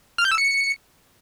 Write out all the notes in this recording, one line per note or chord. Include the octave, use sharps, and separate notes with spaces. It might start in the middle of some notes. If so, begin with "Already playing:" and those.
F6
G6
E6
C#7